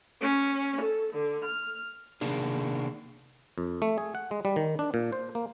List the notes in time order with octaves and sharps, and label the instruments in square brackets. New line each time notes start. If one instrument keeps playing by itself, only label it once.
[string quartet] C#4
A4
D3
F6
[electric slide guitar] C3 D#3 A#3 D4 G#4
[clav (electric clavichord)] F2
A3
G#4
F#5
G#3
G3
D#3
D4
A#2
C5
A#3